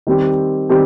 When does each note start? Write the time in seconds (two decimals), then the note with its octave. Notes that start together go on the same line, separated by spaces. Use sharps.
0.07 D#3 G3 C4 G4
0.69 D#3 G3 C4 G4